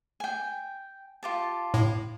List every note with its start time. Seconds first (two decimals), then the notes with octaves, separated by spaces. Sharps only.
0.20 G5 G#5
1.23 F4 G4 A5
1.74 A2